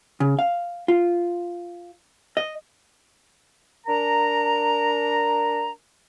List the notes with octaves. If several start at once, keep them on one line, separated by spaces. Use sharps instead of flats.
C#3
F5
F4
D#5
D4 A#4 A#5